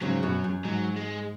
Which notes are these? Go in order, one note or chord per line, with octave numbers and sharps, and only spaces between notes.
G#2 C#3 F#3
F#2 B2
F#2
G#2 F#3
G#3